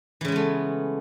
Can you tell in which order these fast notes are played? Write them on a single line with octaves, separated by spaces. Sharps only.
E3 C#3 G#3 B3 A3